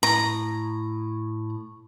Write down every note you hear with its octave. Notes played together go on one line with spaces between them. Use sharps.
A2 A#5